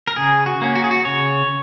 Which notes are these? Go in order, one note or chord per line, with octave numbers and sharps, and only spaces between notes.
A#4
C#3 G#4
F#4
A#3 C#4
F#4
G#4
F#4
C#3 C#5